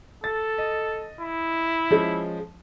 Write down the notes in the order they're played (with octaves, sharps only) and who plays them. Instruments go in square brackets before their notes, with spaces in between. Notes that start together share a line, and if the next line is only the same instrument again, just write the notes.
[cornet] A4 [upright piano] A6
[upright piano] D#5
[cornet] E4
[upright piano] F3 G#3 C#4